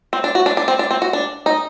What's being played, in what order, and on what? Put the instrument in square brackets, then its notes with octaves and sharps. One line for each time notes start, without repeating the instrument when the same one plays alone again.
[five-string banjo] C4
D4
F#4
D4
D4
C4
D4
C4
F#4
D4
D#4